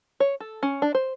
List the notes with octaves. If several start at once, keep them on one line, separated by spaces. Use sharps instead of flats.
C#5
A4
C#4
D4
C5